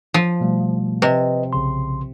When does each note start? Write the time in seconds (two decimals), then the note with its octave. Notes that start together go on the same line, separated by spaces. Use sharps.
0.14 F3
0.41 B2 G3 A3
1.02 C3 B4 D#5
1.53 B1 C#3 C6